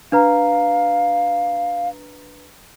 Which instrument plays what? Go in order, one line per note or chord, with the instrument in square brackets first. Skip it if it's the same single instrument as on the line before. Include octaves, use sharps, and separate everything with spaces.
[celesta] D4 B4 A#5 [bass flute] F5